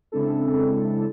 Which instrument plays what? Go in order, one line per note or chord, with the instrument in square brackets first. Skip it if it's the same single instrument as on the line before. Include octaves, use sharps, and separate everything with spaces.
[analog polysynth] C#3 G#3 C4 D4 E4 A4